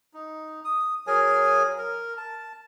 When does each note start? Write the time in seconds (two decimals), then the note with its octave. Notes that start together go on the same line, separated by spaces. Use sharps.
0.14 D#4
0.64 D#6
1.07 F#3 G#4 A#4 G#5
1.78 A#4
2.17 A5